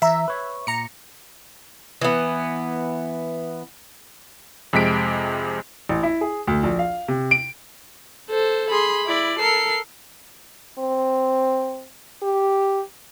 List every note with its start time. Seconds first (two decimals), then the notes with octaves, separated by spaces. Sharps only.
0.02 E3 E5 A#5
0.28 B4 C#5
0.67 A#2 A#5 C#7
2.01 E3 B3
4.73 F2 C3 G#3 B6 D7
5.89 A1
6.03 E4
6.21 G#4
6.47 D2
6.64 A#1
6.79 F5
7.08 C3
7.31 D7
8.30 A4 C5
8.70 G#4 B5 C6
9.07 E4 D5
9.39 A4 A#4 C7
10.78 C4
12.22 G4